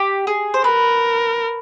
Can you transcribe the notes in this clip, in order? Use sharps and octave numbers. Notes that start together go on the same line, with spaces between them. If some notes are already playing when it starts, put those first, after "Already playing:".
Already playing: G4
G#4
C5
A#4 B4